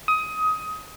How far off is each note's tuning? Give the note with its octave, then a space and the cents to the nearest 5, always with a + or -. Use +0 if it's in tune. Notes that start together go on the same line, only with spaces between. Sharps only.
D#6 +20